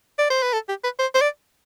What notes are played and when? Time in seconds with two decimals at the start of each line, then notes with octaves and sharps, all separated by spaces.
0.18 D5
0.30 C5
0.42 B4
0.53 A4
0.69 G4
0.84 B4
0.99 C5
1.15 C5
1.21 D5